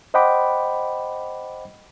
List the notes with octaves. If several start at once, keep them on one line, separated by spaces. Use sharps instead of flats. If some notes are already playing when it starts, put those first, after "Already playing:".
C5 D#5 F#5 G5 B5 D6